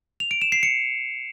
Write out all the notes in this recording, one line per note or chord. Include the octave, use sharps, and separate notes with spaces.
F7
D7
E7
C7
C#7